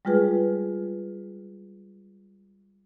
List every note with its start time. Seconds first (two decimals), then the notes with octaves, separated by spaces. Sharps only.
0.05 G3 G#3 F4 G#4 B4